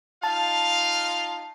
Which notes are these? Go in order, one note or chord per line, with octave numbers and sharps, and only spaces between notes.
D#4 F4 F5 A5